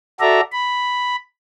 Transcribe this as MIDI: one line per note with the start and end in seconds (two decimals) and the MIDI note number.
0.20 0.41 66
0.20 0.41 69
0.20 0.41 74
0.20 0.41 76
0.20 0.41 82
0.52 1.16 83